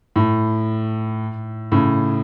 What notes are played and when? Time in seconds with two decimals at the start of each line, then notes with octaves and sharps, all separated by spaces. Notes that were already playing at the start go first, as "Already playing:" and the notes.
0.16 A2
1.72 A2 C#3